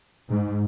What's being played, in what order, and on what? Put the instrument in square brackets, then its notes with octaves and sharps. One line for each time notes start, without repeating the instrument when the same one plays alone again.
[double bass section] G#2